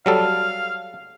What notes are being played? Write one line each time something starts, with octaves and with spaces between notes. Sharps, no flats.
F#3 G3 A4 F5